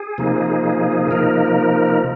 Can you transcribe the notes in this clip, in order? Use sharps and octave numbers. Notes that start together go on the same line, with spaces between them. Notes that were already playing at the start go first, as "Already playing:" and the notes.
Already playing: G#4
C3 F3 A#3 D#4
C3 F3 A#3 D#4 A#4